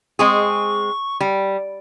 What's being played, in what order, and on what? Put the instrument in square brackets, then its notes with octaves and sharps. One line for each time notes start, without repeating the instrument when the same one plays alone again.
[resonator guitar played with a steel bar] G#3 C4 G#4 [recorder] C#6
[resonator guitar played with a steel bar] G3